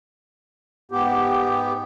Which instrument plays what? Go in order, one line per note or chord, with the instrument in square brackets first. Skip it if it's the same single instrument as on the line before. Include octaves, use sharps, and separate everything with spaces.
[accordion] G#2 B3 G4